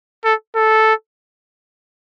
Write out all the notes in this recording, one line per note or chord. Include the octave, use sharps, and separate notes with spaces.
A4
A4